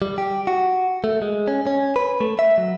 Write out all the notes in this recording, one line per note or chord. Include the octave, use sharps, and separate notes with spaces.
G3
G4
F#4
A3
G#3
C#4
C#4
B4
A3
E5
F#3